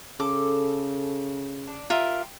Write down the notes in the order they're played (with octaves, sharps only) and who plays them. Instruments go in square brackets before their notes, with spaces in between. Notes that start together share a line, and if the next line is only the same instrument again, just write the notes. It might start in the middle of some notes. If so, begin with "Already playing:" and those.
[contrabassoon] C#3 [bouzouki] A4 [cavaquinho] D6
[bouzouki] D4
[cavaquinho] F4 A#4 E5 [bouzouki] G4